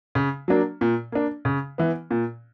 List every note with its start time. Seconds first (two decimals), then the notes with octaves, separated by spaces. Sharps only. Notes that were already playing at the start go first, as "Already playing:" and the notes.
0.15 C#3
0.48 F#3 A#3 D4
0.81 A#2
1.12 A#3 D4
1.45 C#3
1.78 E3 B3
2.11 A#2